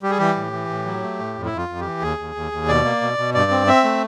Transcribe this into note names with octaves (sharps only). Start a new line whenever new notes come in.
G3 G4
G#4
E3 G4
A2
E3
A2
F#3
A3
A2
F2
E4
F2
F4
F2
E3 G4
D#2 G#4
D#2
D#2
D#2
B2 D5
A#3
B2
B2
G2 D5
C4
C4 E5
A3